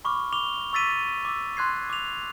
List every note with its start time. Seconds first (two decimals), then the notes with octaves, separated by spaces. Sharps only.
0.05 B5 C#6 D6 F6
0.33 D6 F7 G7
0.73 C#6 E6 A6 B6 D#7
1.25 D6 E6
1.57 C6 F#6 G#6 C7
1.90 D6 F7